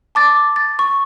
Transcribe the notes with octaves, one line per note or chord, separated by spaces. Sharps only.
A5 D6 A6
A6
C#6